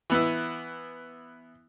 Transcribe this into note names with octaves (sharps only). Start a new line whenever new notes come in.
E3 B3 E4